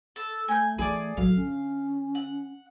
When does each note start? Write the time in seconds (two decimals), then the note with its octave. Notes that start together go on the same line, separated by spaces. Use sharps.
0.16 A4
0.48 A3 G#5 G6
0.78 E3 G#4 D5
1.17 A1 F#3 A4 F5
1.36 D3 C#4
2.15 F#5